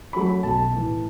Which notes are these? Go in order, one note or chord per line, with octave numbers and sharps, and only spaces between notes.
F#3 A3 C#4 B5
B1 A5
A2 E3